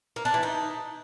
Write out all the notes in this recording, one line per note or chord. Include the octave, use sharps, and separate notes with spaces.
A#3
D4
E3
D#4